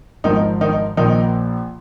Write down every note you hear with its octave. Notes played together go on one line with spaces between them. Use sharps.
G#1 G#2 D#3 F3 D#4
D#3 D#4
A#1 A#2 D#3 F3 D#4